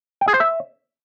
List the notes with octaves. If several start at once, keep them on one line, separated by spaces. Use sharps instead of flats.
G5
G#4
C5
E5